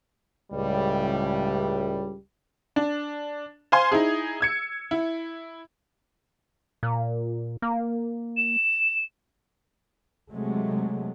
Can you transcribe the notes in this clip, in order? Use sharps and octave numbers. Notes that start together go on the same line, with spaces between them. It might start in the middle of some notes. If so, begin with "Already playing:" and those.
C#2 A2 G3
D4
C5 F5 G#5 C6
D#4 E4 G#4
E6 G#6 C#7
E4
A#2
A#3
E7
C3 F#3 G#3 A3